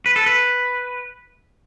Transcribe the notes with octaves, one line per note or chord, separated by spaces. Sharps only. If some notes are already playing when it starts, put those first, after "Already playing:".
B4
A4
B4